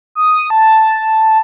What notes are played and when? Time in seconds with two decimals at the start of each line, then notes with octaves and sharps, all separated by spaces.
0.15 D#6
0.50 A5